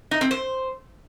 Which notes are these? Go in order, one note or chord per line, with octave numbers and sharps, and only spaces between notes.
D#4
C4
C5